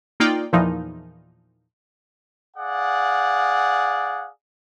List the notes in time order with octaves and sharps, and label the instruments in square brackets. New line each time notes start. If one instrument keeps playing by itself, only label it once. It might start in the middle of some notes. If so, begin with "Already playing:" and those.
[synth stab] A#3 D#4 F4 D5 G5
E2 A#2 E3 F3 D#4
[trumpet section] G#4 D5 F5 F#5